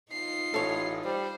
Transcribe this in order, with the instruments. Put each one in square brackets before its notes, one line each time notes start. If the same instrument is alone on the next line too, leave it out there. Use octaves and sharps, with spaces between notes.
[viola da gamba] D#4 F4 [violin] C7
[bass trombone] A1 [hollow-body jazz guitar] A4 C#5
[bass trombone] G3 [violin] C5